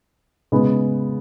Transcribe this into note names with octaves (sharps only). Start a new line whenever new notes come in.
C#3 G#3 B3